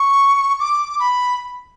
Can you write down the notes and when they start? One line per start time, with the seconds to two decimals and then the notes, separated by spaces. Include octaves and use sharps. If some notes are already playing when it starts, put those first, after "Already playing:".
Already playing: C#6
0.60 D6
0.99 B5